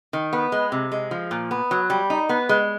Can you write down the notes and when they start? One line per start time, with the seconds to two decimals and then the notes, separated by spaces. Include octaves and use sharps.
0.13 D#3
0.33 B3
0.52 G#3
0.72 C3
0.92 G#3
1.11 F3
1.31 A#2
1.51 B3
1.71 F#3
1.90 G3
2.10 D#4
2.29 B3
2.49 G#3